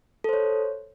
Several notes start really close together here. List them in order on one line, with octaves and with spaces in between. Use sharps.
A4 C5 C#5